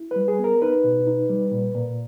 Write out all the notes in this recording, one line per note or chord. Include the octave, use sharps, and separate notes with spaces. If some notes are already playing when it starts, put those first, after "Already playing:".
Already playing: E4
G3 B4
G#4
B3
A#4
D#4 B4
B2
D#4
G3
A#2
A#2